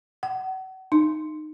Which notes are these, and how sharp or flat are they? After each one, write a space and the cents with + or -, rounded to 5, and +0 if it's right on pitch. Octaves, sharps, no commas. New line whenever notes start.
F#5 +35
D#4 -20